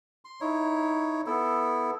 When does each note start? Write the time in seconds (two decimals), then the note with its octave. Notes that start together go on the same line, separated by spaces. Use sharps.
0.25 C6
0.41 D#4 E4 C#5
1.26 B3 E4 A4